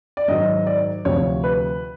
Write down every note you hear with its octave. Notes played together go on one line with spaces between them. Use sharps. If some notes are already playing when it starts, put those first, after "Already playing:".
D5
G#2 D#3 F#3 D#5
D5
D2 C3 F3 C#5
B4